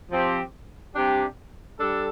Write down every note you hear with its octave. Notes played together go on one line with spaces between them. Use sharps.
F3 C4 G4
C3 G3 D4 G4
G3 D4 A4